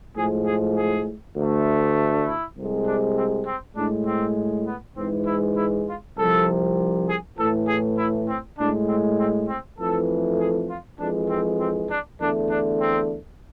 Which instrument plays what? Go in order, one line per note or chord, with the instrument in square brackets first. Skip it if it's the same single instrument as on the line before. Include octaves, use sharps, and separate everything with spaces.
[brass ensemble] A2 F3 G#3 G#4
G#4
G#4
D2 D3 A3
E4
C2 C3 G#3
D4
C4
C4
A2 G#3 D4
C4
B3
G#2 E3 G#3 C4
E4
E4
F4
C2 C3 F3 A4
G#4
A2 E3 A3 A4
G#4
E4
C4
A2 G#3 D4
C4
C4
C4
F2 E3 A3 A4
G#4
F4
F2 E3 G#3 D4
C4
C4
D4
E2 D3 A3 D4
D4
C4